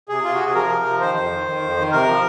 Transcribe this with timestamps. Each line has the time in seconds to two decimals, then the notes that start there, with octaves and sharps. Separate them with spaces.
0.09 C3 G#4
0.24 C3 F4
0.34 F#4
0.40 C3 G#4
0.54 F3 A#4
0.70 C3
0.86 F3
1.00 D#3 C5
1.17 F2
1.32 D#3
1.47 D#3
1.62 F2
1.77 D#3
1.92 C3 A#4
2.08 F3